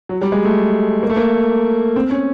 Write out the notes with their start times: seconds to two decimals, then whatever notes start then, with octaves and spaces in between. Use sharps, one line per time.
0.09 F#3
0.22 G3
0.32 G#3
0.44 A3
1.03 A#3
1.10 A3
1.16 A#3
1.96 C4
2.10 C#4